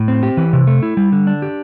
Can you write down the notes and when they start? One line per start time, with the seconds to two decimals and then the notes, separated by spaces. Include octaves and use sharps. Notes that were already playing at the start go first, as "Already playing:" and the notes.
Already playing: A2
0.08 C4
0.23 G4
0.37 E3
0.53 C3
0.67 A3
0.83 E4
0.97 G3
1.12 D3
1.27 D4
1.42 G4